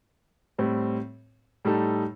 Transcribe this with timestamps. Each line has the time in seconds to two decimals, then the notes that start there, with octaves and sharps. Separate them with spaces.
0.58 A2 G3 C4
1.65 A2 G3 D#4 A4